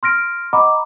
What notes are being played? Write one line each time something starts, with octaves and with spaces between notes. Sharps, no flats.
C6 F6 A#6 D7
D#5 F#5 A#5 B5 D6